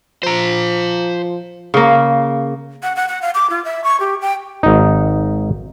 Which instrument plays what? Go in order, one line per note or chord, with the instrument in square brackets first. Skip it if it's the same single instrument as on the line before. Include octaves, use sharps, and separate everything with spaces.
[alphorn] F3 [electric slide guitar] C5 A#5
[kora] C#3 A#3
[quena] F#5
F#5
F#5
F5
D6
F4
E5
C#6
G4
G5
[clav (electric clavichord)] G#1 D#4